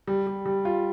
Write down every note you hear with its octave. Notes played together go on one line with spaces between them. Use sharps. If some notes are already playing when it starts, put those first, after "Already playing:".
G3
G3
G3
F4